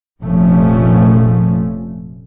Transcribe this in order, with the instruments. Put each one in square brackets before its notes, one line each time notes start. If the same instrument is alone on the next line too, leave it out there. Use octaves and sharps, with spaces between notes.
[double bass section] F1 A#2 F3 A3 C#4